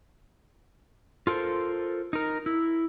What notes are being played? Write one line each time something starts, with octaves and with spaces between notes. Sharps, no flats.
F4 A4 A#4 C5
D#4 A#4
E4